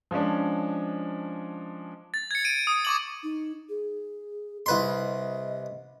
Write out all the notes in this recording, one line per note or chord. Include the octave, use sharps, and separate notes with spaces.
F3 G#3 C#4 D4
A6
G#6 C#7
D7 D#7
D#6
C#6 D6 F#7
D#4
G#4
C2 B4 D#5 C6